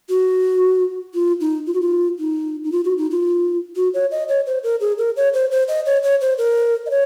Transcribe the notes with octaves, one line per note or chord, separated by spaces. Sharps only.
F#4
F4
D#4
F4
F#4
F4
D#4
D#4
F4
F#4
D#4
F4
F#4
C#5
D#5
C#5
C5
A#4
G#4
A#4
C#5
C5
C5
D#5
C#5
C#5
C5
A#4
D#5
C#5